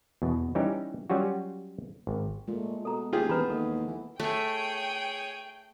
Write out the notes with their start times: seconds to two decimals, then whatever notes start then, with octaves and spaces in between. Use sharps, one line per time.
0.22 E2 B2
0.55 E3 G3 C#4 D#4 G4
1.10 F#3 G3 C#4 F4 F#4
2.07 G#1
2.48 A#2 G#3 A3
2.85 B2 A4 A#5
3.13 D#1 F4 G4 G#4
3.29 E3 B3 B4 A#5 B5
3.50 D#2 A4
3.88 E3
4.20 A3 G#4 C#5 G5